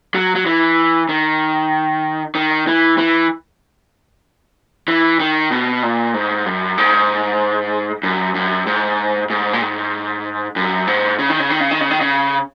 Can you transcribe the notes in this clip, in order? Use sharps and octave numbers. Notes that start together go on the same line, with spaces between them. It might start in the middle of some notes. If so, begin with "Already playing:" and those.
F#3
F#3
E3
D#3
D#3
E3
E3
E3
D#3
B2
A#2
G#2
F#2
G#2
F#2
F#2
G#2
G#2
A#2
G#2
F#2
G#2
C#3
D#3
C#3
D#3
C#3
D#3
C#3
D#3
C#3